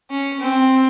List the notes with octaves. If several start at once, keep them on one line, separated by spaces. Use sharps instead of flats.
C#4
C4